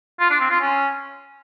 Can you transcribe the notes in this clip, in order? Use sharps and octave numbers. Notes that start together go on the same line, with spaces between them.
F4
D4
C4
F4
C#4